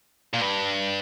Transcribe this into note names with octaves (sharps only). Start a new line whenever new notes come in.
A#2
G2